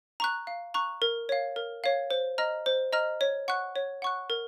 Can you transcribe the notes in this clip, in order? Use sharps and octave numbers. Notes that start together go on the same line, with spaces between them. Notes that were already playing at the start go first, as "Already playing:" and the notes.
A#5 C#6 F#6
F5
A#5 C#6 F#6
A#4
C#5 F5
A#4
C#5 F5
C5
D#5 A#5 F6
C5
D#5 A#5 F6
C#5
F#5 C#6 F#6
C#5
F#5 C#6 F#6
A#4